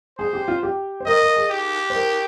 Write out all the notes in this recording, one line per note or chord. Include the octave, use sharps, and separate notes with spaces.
G#4 C5
G4
F4
G4
C5
A#4 D#5
A#4
G#4
G4
C5
A#4